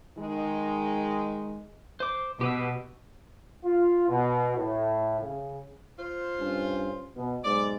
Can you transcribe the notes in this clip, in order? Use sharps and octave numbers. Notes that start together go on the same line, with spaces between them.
D#3 G#3
C5 D6
B2 G4 B4 E6
F4
B2
A2
C#3
F4 C5
G2 C#4
B2
B1 G#2 D5